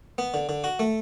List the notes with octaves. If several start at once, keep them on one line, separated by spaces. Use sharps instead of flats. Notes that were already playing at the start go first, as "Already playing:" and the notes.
B3
D3
D3
F#4
A3